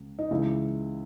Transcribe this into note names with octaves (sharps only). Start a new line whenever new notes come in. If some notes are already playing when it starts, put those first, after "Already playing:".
Already playing: C#2 C#3
D#4
C#2 C#3 E3 E4